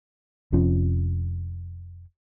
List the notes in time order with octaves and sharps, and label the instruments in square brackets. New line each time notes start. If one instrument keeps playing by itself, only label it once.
[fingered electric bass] F1 F2 F3 C#4